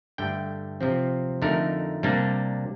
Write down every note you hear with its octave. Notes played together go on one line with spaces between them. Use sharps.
G2 D3 A3 G5
C3 F3 C4
F2 D3 A3 D#4 A#4
C3 G3 A#3 D4